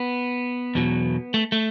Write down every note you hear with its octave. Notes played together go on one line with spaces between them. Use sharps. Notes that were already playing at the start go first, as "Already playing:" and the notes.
Already playing: B3
E2 B2 F#3
A3
A3